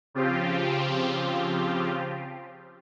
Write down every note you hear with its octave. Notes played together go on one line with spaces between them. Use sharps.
C#3 F3 C4 F4 G4